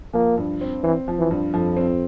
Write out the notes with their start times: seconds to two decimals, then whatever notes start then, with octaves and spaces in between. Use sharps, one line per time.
0.13 F3 A#3
0.37 G2
0.61 C4
0.83 E3 C4
1.08 F3
1.18 E3
1.31 G2
1.54 F2 F3
1.77 C4